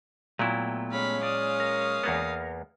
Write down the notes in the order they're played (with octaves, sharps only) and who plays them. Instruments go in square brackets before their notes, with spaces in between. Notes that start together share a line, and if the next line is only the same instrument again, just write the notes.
[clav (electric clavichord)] A#2 F#3 E4 [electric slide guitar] A3 B3 G5
[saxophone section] G#3 C#4 [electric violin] F5 B5
[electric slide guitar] D5 [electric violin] F5 D#6
[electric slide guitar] A#4
[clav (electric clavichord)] E2 A#3 B3